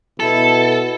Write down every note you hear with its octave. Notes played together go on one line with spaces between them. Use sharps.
B2 E4 A4